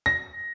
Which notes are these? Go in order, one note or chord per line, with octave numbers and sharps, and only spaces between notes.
A#6